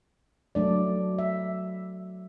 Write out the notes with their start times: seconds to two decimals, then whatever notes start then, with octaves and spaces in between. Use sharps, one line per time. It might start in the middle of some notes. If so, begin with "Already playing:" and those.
0.55 F#3 A3 D4 D5
1.18 E5